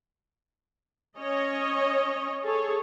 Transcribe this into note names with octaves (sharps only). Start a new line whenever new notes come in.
C#4 C#5 D#5
G#4 A4 C#5